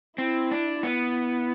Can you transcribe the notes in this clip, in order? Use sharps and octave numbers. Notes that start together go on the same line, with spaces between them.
C4 E4
D4
B3 E4